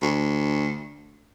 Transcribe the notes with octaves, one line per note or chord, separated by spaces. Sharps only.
D2